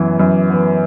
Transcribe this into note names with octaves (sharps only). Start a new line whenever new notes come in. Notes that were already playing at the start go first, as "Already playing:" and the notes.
Already playing: F#2 E3 B3
F#2
E3 B3